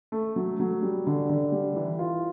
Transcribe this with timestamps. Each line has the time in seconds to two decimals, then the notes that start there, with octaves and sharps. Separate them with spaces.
0.12 A3
0.36 F#3
0.60 F#3
0.82 G3
1.07 D3
1.29 D3
1.52 G3
1.76 E3
1.99 F4